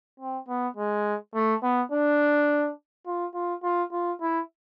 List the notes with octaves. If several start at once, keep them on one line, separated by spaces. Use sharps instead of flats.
C4
B3
G#3
A3
B3
D4
F4
F4
F4
F4
E4